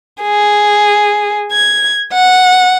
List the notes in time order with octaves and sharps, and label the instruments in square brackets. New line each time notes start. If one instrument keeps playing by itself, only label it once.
[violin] G#4
G#6
F#5